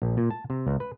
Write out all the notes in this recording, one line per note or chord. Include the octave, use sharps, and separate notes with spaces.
A#1
A#2
A5
C3
C#2
B4